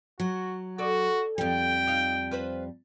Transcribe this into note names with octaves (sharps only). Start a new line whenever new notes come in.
F#3 F#4
F#4 A4 D5
F2 G3 G5
D#4 F5
F4 B4 C5